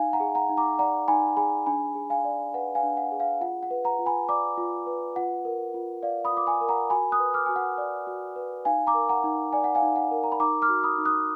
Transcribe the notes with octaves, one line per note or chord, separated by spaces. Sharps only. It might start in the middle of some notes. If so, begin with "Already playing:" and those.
Already playing: D#4 F5 G#5
F#5 A#5
G#4
F#5 A#5
D#4
A#5 D6
D5 F#5 A#5
D#4 G#5 B5
G#4 G#5 B5
D4 G#5 B5
G#4
F5 G#5
D5
B4 F#5
F5 G#5
D4
F#5
G#4
F5
F4 F#5
F#5
B4
F#5 A#5
F4
G#5 B5
D5 A#5 D6
F4
B4
F4 F#5
A#4
F4
D5 F5
B5 D#6
F4 D6
G#5 B5
A#4
F#5 A#5
F#4 G#5 B5
D#6 F#6
B4
D6 F6
F#4 G#5
F#5
D5
F#4
B4
D#4 F5 G#5
A#5 D6
A#4
F#5 A#5
D#4
D5 G#5
F#5
F5 G#5
D#4
F#5
A#4
A#5
B5
D#4 A#5 D6
D6 F6
F#4
B5 D#6
D#4
D#6 F#6